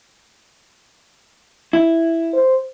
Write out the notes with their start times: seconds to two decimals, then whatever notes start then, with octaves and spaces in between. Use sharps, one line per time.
1.73 E4
2.34 C5